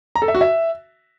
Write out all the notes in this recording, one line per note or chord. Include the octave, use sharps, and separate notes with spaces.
A#5
A4
E5
F#4
E5